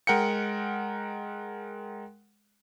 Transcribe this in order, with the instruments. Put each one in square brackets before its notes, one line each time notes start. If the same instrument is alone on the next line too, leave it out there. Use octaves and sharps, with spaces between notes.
[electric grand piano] G#3 A#4 F#5 G5 C#7